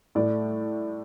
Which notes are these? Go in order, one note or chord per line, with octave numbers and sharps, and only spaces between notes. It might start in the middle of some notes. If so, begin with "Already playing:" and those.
A2 A3 D5